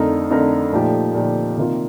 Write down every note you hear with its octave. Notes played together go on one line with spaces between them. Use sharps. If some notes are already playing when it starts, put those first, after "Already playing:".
Already playing: F2 D3 A3 D#4 A#4
F2 D3 A3 D#4 A#4
A#2 F3 A3 D#4 G4
A#2 F3 A3 D#4 G4
C3 D#3 A#3 F4